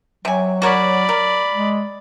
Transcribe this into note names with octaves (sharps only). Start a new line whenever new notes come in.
C3 F#3 G#5
F#4 A#4 C#5 D5 B5
A#4
G#3